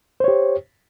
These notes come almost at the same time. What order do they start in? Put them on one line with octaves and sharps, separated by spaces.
C5 C#5 G4